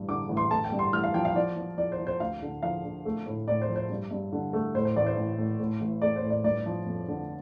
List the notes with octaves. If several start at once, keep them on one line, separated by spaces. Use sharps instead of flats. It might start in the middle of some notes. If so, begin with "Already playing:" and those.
Already playing: A1 G2
D3 D6
A1
C6
A3 A5
G5
G2
C6
A1 F6
F5
F3 G5
F5
F3 D5
F3
F3 D5
C5
F3
C5
D2 F5
D3
F3 F5
D3
A3
A2
A2 D5
C5
F3
C5
G2
G2
D3
A3
A2 C5
C5
A1 D5
C5
A1
A2
A2
A1
A3 D5
C5
A2
D5
G1 D5
F3
F2
D3